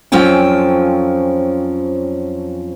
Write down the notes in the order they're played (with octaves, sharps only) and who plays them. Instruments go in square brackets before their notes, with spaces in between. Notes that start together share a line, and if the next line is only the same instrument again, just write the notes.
[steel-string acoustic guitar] F2 F3 F#3 C#4 G5 G#5